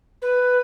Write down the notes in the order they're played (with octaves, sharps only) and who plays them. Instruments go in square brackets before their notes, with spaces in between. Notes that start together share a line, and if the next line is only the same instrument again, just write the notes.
[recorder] B4